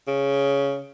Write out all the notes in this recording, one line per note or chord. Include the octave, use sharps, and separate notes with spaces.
C#3